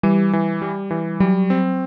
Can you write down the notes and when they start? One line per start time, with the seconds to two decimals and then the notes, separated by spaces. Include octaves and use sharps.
0.03 E3 G3
0.33 E3
0.62 G3
0.91 E3
1.20 F#3 G3
1.50 C4